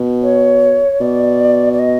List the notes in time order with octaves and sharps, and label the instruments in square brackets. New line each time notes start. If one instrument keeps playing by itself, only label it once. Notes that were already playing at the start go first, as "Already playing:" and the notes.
Already playing: [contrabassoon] B2
[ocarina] C#5
[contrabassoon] B2 [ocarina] D5
[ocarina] D5
D#5